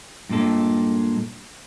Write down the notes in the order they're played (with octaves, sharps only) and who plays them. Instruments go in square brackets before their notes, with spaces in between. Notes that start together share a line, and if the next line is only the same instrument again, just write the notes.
[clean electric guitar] G2 A#2 G#3 A4